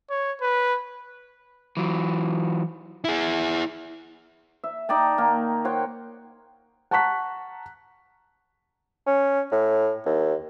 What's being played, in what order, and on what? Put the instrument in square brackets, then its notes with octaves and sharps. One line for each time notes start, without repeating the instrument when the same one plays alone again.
[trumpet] C#5
B4
[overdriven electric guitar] E3 F#3
[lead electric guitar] E4 G#4
[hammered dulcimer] E5
D#4 D5 G5 A5
D#3 A#3
C5 C#5 F#5 G5
[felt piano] F#5 A5 A#5 C#6 F#6 B6
[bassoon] C#4
A2
D#2